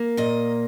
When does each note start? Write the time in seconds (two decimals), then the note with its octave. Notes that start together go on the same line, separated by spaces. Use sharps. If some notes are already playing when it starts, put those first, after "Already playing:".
Already playing: A#3
0.17 A#2 D#5